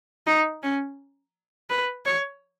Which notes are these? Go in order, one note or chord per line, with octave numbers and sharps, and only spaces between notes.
D#4
C#4
B4
C#5